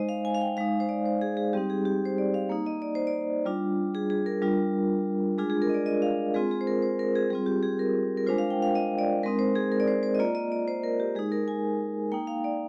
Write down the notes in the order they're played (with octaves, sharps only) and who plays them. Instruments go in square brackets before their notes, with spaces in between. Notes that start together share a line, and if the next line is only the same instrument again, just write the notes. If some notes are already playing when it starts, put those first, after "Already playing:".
Already playing: [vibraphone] G#3 D#4 C5 D#5
F5
G#5
F5
G5
G#3 D#4 F5
C5
D5
C5
G#4
G#4
G3 C4 D#4 G4
G#4
G4
C5
D5
F5
A#3 D#4
D#5
D5
C5
D5
G3 D4 F4
G#4
G#4
A#4
G3 D4 F4
G#3 D4 F4 G#4
G#4
A#4
D#5
D5
D#5
F5
G#3 C4 F4 G#4
G#4
C5
A#4
C5
A#4
G#4
G3 G#4
C4 F4
G4
G#4
A#4
A#4
G#3 D4 F4 C5
F5
G5
F5
D#5
D5
G#3 C4 D#4 A#4
C5
G#4
A#4
D5
C5
C5
D#5
A#3 F4 D5
D#5
D5
C5
A#4
G4
G#3 G#4
D#4
A#4
G#5
A#3 D#4 G5
F5
D5